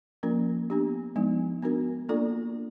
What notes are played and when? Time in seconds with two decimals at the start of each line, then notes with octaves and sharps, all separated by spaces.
0.23 F3 A#3 C#4 F4 A#4
0.70 B3 D4 G4
1.16 F3 G#3 B3 D#4
1.62 B3 D4 F#4 A#4
2.09 A#3 D4 F4 A4 D5